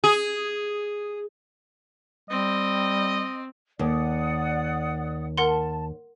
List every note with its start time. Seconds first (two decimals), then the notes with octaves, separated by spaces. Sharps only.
0.04 G#4
2.30 G3 C4 D#5
3.79 D#2 D5 F#5 D#6
5.38 A#4 F#5 A5 C6